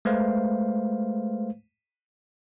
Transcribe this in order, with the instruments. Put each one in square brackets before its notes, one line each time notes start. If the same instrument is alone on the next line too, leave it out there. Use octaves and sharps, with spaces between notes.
[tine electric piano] G#3 A3 B4 C5 F5